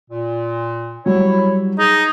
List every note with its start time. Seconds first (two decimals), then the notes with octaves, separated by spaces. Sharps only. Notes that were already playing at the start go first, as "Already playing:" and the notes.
0.11 A#2
1.06 F#3 G3 E4 C#5
1.79 D#4 G#4